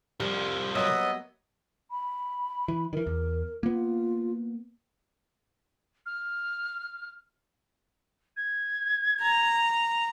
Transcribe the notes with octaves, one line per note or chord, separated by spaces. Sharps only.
C2 F3 G3
F#3 A#3 B3 D#5 E5
B5
E3
D#3 E3 A#4
E2
A#3 B3 F4
F6
G#6
A#5